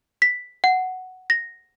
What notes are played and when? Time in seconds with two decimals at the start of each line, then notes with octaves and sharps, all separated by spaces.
0.22 B6
0.64 F#5
1.30 A#6